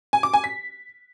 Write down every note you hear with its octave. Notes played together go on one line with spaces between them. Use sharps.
G#5
D6
G#5
B6